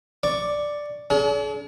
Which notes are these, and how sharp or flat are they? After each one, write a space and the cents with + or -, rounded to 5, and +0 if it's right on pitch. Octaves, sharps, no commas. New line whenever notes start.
D5 +0 C#6 +10
D4 -45 G#4 +45